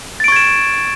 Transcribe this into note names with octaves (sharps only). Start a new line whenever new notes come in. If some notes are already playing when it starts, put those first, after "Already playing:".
C#6 G#6 A6 D7 E7